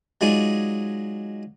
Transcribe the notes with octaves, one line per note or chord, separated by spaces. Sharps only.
F#3 G#3 D#4 F4 G#4 D5